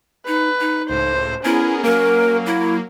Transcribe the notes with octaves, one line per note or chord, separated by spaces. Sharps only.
D#4 B4
D#4
C#2 A2 C5
B3 C#4 E4 G#4 A#4
F#3 A#3 A#4
E4